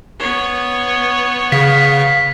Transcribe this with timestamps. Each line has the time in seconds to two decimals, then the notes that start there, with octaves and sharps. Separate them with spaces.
0.20 B3 C#5
1.52 C#3 F5 B6